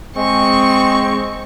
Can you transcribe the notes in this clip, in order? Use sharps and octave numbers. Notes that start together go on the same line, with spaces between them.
G#3 C4 C#6